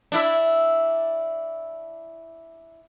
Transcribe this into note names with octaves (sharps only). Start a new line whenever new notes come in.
D4 E4 E5